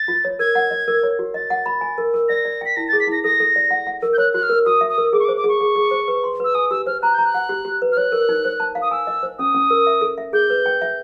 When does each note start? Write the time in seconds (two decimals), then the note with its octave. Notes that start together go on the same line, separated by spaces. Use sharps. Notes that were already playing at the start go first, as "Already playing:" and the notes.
Already playing: A6
0.08 F4
0.25 C#5
0.39 A#4 G#6
0.55 F#5
0.71 D#5
0.88 A#4
1.03 C#5
1.19 F#4
1.34 D#5 A6
1.50 F#5
1.66 B5
1.81 G#5
1.98 A#4
2.14 A#4
2.29 D5 A#6
2.45 D5
2.61 G5 B6
2.76 E4 A#6
2.88 A6
2.93 G#4
3.00 B6
3.07 E4 A#6
3.24 A4 A#6
3.40 A4
3.56 D5
3.71 F#5
3.87 F#5
4.02 A#4
4.13 G6
4.18 C#5 F#6
4.33 F#4 F#6
4.43 F6
4.50 A#4
4.66 F#4 D#6
4.81 E5
4.90 D#6
4.98 A#4
5.13 G#4 D6
5.20 C#6
5.25 D6
5.29 C5
5.37 D6
5.44 G#4 C#6
5.60 G#4
5.76 G#4
5.91 C5
6.08 B4
6.24 C6
6.40 B4 E6
6.55 G#5 D#6
6.71 G4 E6
6.86 C5 F6
7.02 A#5 F#6
7.14 A#5 G6
7.25 F#6
7.34 F#5
7.49 G4
7.65 G4
7.82 B4
7.92 F6
7.97 C#5 F#6
8.12 A#4
8.29 D#4
8.45 C5
8.60 A5
8.75 F5
8.82 D#6
8.91 G#5 E6
9.07 D#5
9.23 C5
9.39 C#4 D#6
9.54 C#4
9.70 A#4
9.87 E5
10.01 A4
10.18 E5
10.33 G#4 G6
10.50 B4
10.66 G5
10.81 E5